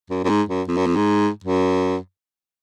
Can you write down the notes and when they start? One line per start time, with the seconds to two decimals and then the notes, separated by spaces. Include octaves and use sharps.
0.10 F#2
0.24 F#2
0.29 G#2
0.49 F#2
0.68 F2
0.77 F#2
0.87 F2
0.96 G#2
1.44 F#2